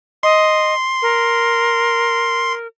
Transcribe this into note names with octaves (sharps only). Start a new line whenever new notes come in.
D#5 C6
A#4